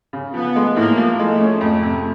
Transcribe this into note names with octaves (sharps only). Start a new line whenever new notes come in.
C#3
F3 B3
G#3
A2 A#3
F3
G#3 A3
C#4
F2
C3